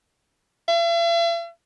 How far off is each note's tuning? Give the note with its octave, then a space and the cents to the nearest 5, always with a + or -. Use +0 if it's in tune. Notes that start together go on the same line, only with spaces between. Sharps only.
E5 +45